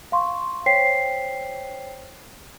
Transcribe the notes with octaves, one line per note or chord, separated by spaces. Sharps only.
F5 C6 C#6
C5 C#5 G5 B6 C7